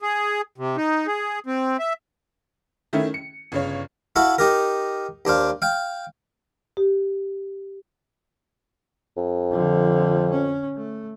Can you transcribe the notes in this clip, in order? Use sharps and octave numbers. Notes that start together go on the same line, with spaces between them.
G#4
C3
D#4
G#4
C4
E5
D#3 A3 C#4 E4
C#7
G1 C#3 C#5
E4 F#4 A4 F5 F#5
D#4 G4 A#4
D#2 D4 C5 F5
F5 G5
G4
F2
D3 F3
C#4
A3